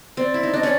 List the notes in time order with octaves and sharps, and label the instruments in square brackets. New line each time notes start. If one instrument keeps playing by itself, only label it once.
[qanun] C4 [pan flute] D5
[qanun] E4
D#4
[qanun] D4 [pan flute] D#5
[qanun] C#4 [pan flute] D5